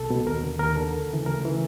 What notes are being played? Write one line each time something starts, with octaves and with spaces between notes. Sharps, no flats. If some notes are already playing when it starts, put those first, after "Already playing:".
Already playing: C2 B2 A4
B2
D#2 A#4
D3
D#2 A#4
D3 A4
D2
C#3 E3
D2 A#4
C#3 E3